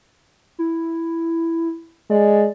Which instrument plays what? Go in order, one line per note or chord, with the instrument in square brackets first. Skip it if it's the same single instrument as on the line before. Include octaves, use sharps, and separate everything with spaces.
[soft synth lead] E4
[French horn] G#3 [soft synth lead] D5